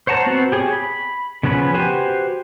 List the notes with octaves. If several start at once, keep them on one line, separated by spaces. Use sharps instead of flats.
C5 C#5 F#5 A5 A#5
B3 C4 F#4 B4 C5
G4 G#4 C#5
B5
C#3 F3 B3 C#4 B5
F#4 G4 B4 C5 G#5